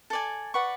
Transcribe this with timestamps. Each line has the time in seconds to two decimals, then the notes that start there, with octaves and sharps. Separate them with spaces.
0.10 A4 D5 G#5
0.54 B4 D5 F#5 C#6